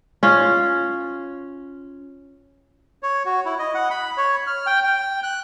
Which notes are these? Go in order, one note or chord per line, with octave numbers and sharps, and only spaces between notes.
C#4 F4
C#5
F#4
E4
D#5
F#5
B5
C#5
F6
G5
G5
F#6